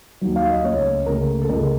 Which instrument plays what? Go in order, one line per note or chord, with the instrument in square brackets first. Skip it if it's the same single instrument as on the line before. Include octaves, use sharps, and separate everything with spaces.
[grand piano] D#2 D#3 F#3
F5
D#5
C#2 C#3 A3 C#5
C#2 C#3 A3 A#4
A4
C#2 C#3 A3 A#4